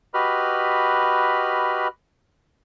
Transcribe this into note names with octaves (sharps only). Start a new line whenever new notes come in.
F#4 G4 B4 D#5 B5 F6